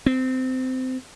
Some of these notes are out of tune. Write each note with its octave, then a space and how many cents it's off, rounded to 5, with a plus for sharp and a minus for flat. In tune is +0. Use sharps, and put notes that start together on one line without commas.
C4 -20